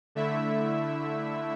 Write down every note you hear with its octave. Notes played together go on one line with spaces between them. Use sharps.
D3 A3 E4 E5